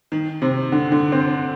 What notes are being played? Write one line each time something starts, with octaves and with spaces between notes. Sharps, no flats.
D#3
C3
D3
D3
C4